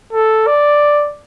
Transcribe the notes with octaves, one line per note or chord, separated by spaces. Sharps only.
A4
D5